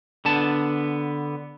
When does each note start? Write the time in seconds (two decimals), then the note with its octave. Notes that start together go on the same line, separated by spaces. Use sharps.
0.25 D3 B3 A5